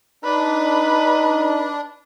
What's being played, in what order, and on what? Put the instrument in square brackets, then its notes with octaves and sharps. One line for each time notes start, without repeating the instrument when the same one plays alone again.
[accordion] D4 [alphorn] D#4 [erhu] B4